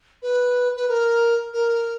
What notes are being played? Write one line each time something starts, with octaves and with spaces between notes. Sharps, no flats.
B4
B4
A#4
A#4